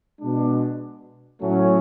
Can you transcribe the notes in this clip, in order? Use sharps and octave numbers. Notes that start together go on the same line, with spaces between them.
B2 G#3 D4
A2 F#3 A3 C#4